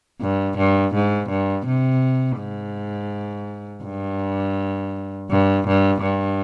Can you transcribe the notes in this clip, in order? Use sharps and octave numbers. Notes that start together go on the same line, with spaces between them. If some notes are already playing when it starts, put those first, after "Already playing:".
G2
G2
G#2
G2
C3
G#2
G2
G2
G2
G2